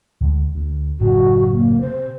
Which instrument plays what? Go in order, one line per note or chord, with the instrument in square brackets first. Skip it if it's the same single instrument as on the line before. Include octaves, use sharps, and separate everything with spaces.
[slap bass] D2 G#3
D2
[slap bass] F#1 A2 F#3 [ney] F#4
[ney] A#3
[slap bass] C3 [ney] C5